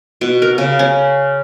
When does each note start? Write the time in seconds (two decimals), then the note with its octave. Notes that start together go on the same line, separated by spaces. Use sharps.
0.21 B2
0.42 A#4
0.58 C#3
0.79 C#4